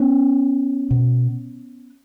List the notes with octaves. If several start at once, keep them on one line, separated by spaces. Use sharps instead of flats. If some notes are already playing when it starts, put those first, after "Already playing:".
Already playing: B3 C#4
B2